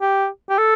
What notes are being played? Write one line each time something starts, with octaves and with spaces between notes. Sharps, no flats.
G4
G4
A4